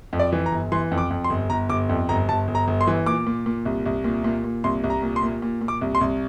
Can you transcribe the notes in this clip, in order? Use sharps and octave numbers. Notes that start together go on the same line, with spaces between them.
F2
D5
E3
A#5
G1
E3 C6
F2
D6
F2
C6
G1
G1 A#5
G1 D6
F2
G1 A#5
G1 A5
G1
A#5
G1
C6
E3
A#2 D6
A#2
A#2
C2
C2
A#2
A#2
A#2
C2 C6
C2
A#5
A#2
C6
A#2
A#2
A#2
D6
C2
C6
C2